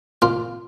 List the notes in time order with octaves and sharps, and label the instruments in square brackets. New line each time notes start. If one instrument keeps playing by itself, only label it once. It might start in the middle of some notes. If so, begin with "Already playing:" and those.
[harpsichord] A#2 F4